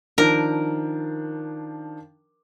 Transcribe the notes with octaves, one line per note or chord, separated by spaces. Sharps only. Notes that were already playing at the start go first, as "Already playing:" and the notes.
D#3 F3 D4 A#4